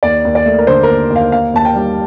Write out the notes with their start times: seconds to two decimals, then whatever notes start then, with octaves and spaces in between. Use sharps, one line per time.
0.03 D#2 D5
0.25 D#2
0.35 D5
0.46 A3
0.59 A#4
0.67 D3 C5
0.83 A#4
0.89 D#2
1.10 D#2
1.16 F5
1.32 A#3 F5
1.54 D#2 A5
1.65 G5
1.76 G3